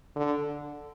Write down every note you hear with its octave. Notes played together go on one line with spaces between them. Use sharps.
D3